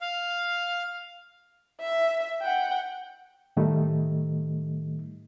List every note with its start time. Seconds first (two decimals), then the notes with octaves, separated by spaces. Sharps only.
0.01 F5
1.80 E5
2.42 F#5 G5
3.57 A2 D#3 G3 A3 D#4